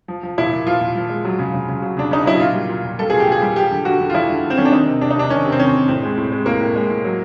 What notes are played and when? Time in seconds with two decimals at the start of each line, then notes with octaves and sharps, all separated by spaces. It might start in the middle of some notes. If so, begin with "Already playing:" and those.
0.08 F3
0.23 F3
0.38 A#2 E4
0.53 A#2
0.66 F3 F4
0.81 A#2
0.96 F3
1.09 G#3
1.25 F#3
1.39 C#3
1.54 C#3
1.68 C#3
1.82 F#3
1.97 C#3 D4
2.11 C#3 D#4
2.26 F#3 E4
2.40 A#2 F4
2.55 G3
2.69 A#2
2.84 A#2
2.99 G3 A4
3.10 A#2 G#4
3.20 G4
3.27 A#2 G#4
3.42 G3
3.56 F3 G4
3.71 D3
3.85 D3 F#4
4.00 D3
4.10 F4
4.14 D3 E4
4.29 D3
4.43 D3
4.50 C4
4.57 D3 C#4
4.65 D4
4.72 D#3 D#4
4.86 C3
5.01 C3 D4
5.10 D#4
5.16 C3 D4
5.30 D#3 C#4
5.45 C3
5.52 C4
5.59 D#3 C#4
5.74 D#3
5.88 A2 C4
6.03 G#3
6.17 A2
6.32 G#3
6.46 A2 A#3
6.61 A2
6.76 G#3
6.90 A2
7.04 F#3